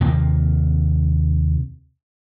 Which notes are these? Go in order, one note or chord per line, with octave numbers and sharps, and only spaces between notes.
D#2 C3 A#3